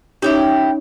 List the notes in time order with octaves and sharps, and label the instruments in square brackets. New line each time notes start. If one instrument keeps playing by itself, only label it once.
[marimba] C#4 D#4 C#5 [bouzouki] E4 F#4 G4